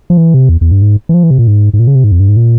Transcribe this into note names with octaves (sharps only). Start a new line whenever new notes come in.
F3
E3
C3
E2
E2
G2
G#2
E3
F3
E3
C3
A#2
G#2
G#2
A#2
C#3
C3
G#2
F2
G2
G#2
A#2